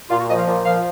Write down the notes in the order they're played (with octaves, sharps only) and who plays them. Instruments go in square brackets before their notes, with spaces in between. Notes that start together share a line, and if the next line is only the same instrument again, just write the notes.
[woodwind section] A#2 F4
F#4
F3 D#5
F5
A#2
F3 F5